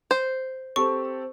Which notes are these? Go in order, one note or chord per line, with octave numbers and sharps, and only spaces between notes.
C5
C4 G4 A4 C#6